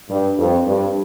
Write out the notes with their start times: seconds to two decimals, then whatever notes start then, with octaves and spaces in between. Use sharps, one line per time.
0.10 G2
0.39 F2
0.67 G2